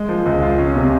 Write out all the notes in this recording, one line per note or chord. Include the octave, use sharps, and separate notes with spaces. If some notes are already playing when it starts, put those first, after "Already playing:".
Already playing: G#3
F3
C#2
F4
C#4
C3